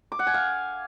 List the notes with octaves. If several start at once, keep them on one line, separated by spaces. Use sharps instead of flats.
D6
F#5
G#5
F5